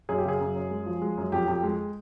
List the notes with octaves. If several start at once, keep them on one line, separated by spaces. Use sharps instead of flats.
F#2 G#4
G4
C#3 G#4
F#2
F#2
G#3
F3
G#3
F#2
F2 G4
F2
G#3